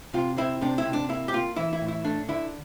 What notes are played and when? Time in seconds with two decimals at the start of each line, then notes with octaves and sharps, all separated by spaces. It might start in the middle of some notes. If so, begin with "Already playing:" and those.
0.13 C3 F4
0.37 C4 E4
0.61 C3 D4
0.78 E4
0.85 C3
0.93 D4
1.09 A#3 E4
1.28 G4
1.33 A#3 F4
1.56 E3 E4
1.73 E4
1.81 A2
1.88 E4
2.04 A3 D4
2.28 D3 E4